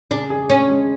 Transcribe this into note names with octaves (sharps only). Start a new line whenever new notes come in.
C#3 D4
G#4
C#4 D4
G#3